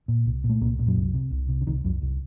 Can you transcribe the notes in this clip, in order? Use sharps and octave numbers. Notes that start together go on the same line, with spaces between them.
A#2
C2
A#2
A3
C2 A#2 A#3
A#2
F#2 F#3
C2
C3
C2
C3
D3
C2 D#3
C2 F#2 F#3
C2